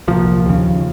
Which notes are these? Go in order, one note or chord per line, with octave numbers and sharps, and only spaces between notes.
C2 A#2 F3
D#2 C#3